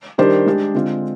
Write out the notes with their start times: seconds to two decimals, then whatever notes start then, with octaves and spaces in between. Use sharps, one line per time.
0.18 D#3 G3 D4 G4 C5
0.46 G#3 D4 G4
0.74 D3 G#3 C4 F4